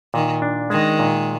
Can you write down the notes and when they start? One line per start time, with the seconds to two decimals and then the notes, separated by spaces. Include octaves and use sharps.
0.14 A#2 D#3
0.42 D4
0.70 D#3 G#3
0.99 A#2